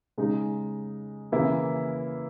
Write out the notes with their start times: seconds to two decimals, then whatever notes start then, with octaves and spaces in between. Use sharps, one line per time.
0.18 C#3 G#3 D#4
1.32 C#3 E3 A#3 E4